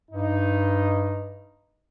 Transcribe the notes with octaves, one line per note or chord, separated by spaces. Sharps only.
G2 D#4